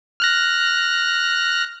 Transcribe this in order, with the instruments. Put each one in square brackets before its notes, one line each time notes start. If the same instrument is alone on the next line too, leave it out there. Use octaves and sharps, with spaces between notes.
[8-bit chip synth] F6 F#6 A#6